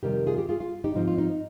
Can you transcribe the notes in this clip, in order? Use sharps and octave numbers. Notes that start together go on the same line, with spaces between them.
F2 C3 D#3 G3 G4 A#4
F4 G#4
G4
F4 G#4
F4
D#4 G4
G#2 F3 C4 D#4
F4
D#4